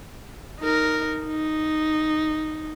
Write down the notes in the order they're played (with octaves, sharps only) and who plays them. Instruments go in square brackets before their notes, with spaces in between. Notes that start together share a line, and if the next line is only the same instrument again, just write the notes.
[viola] D#4 A#4
D#4